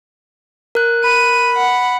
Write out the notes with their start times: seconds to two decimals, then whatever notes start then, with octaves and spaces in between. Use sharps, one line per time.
0.75 A#4 F#6
1.04 B5 D#7
1.56 F#5